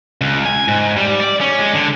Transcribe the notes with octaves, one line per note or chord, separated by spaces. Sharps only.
C#2
G#5
G#2
G3
D5
C#4
G#3
D3